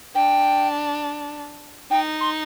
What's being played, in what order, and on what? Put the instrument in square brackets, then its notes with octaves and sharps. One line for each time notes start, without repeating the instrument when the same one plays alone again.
[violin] D4 [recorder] G5
[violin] D#4 [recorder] G5
[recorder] C6